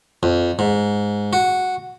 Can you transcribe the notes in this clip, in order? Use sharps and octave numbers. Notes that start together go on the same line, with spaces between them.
F2
G#2
F#4